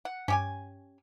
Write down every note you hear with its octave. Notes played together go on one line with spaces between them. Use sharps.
F#5
G2 C#4 G4 G#5